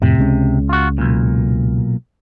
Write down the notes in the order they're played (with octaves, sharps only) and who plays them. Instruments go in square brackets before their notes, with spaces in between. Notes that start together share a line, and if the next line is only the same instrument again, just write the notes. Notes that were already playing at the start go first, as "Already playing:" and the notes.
[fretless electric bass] F2 A2 [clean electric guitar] C3
[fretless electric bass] C#2 G#3 C#4
[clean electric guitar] F4 F#4
B1 A#2